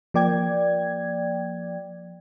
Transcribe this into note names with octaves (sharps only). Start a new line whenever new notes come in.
F3 A#3 D5 G5 G#6